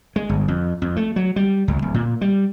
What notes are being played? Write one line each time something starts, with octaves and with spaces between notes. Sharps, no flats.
G#3
G1
F2
F2
A3
F#3
G3
C#2
D1
A#2
G3